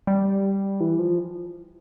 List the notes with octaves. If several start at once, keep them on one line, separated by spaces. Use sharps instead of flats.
G3
E3
F3